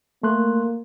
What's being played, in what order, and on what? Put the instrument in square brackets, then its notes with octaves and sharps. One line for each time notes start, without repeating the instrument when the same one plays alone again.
[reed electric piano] A3 C6 F#6 [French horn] A#3